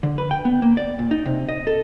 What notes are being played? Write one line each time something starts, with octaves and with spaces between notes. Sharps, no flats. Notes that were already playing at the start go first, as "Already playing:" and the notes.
D3
B4
G5
B3
A#3
D5
A#2
D#4
C3
D#5
A4